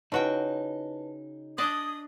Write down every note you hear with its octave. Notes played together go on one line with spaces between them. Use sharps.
C#3 D#4 E4 F#4 B4 G5 A5
D4 D5 D#5 D#6 F#7 G7